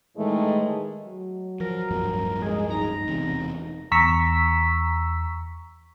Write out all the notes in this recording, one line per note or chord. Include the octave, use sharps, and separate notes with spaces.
A2 D#3 E3 G#3 A3
F#3
F3 A#4
D1 G2 F3
G#3 G#4
D#4 A#5
E1 E2 C3
E2 A#5 C#6 E6 B6